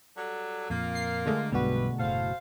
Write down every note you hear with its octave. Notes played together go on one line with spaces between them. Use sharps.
F#3 G3 A4
F2 A#2 A#3 F4 A#4
C7
D3 G#3 A3
B1 G2 B2 G3 F#4 B4
F#1 A2 A4 C5 F5